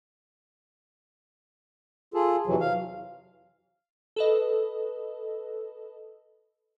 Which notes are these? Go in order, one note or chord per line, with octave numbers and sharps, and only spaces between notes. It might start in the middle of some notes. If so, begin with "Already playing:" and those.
F4 G#4 A4
F2 C3 E3 F#3
F5
A4 B4 D#5